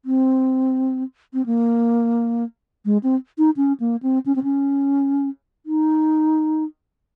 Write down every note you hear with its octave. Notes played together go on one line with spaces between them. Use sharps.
C4
C4
A#3
G#3
C4
D#4
C#4
A#3
C4
C#4
C4
C#4
D#4